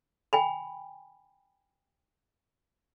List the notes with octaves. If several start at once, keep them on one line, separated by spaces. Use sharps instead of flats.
G5 G#5 B5